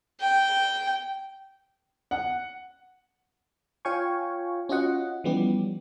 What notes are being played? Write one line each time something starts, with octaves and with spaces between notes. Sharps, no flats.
G5
F#5
F4 C#5 F5 G5 G#5 C#6
C#4 F4 F#4 D#5 F#5
E3 F3 G3 B3 C#4 G4